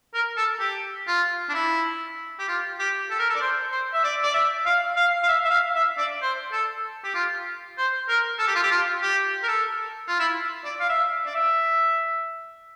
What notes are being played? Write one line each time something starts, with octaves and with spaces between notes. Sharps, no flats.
A#4
A4
G4
F4
D4
E4
G4
F4
G4
A4
A#4
A4
D5
C5
C5
E5
D5
D5
E5
F5
F5
F5
E5
E5
F5
E5
D5
C5
A4
G4
F4
C5
A#4
A4
G4
F4
G4
F4
G4
A#4
A4
F4
E4
D5
F5
E5
D5
E5